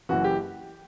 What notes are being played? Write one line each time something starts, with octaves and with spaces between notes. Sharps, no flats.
F#1 F#2 E3 F#4
G4